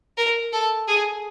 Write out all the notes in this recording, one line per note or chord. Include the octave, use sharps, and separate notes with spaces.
A#4
A4
G#4